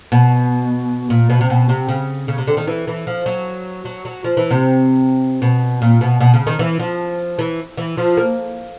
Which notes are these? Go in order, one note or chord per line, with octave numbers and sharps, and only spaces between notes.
B2
A#2
B2
C3
B2
C3
C#3
C#3
C3
D3
D#3
E3
E3
F3
F#3
F#3
F#3
F3
E3
C3
B2
A#2
B2
B2
C#3
D#3
E3
F3
E3
E3
F3
A#3